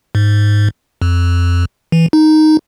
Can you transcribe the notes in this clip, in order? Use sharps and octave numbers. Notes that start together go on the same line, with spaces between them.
G#2
F2
E3
D#4